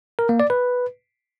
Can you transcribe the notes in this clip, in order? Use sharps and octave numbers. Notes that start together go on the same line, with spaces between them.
A#4
A#3
D5
B4